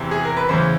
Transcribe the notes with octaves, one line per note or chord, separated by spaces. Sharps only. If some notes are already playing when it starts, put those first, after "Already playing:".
Already playing: E2 C3 E3
G#4
A#4
B4
E2 C#3 E3 C5